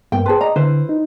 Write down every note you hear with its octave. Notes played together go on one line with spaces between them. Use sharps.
G2 A#3 B3 G5
G#4 B4 C5 A5 C6
D5 D#5 A#5
D3 E4 B4 C5
D#4